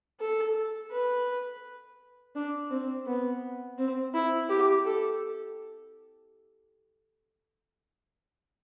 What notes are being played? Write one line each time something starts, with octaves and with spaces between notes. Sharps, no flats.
A4
B4
D4
C4
B3
C4
E4
G4
A4